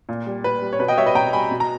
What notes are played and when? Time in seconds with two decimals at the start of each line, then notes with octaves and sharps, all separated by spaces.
0.09 A#2
0.27 G3
0.44 A#2 B4
0.62 G3
0.73 C#5
0.79 B2 B4
0.88 D#5 G5
0.97 G3 C#5 E5
1.06 B4 D#5
1.15 B2 G5 A#5
1.33 G3 G#5 B5
1.51 B2
1.60 A#5